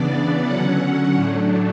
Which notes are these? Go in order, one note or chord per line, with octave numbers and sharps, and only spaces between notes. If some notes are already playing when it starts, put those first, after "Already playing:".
Already playing: C#3 E3 B3 D4 D5
D3 F#3 C#4 F#5
A2 F#3 A3 D4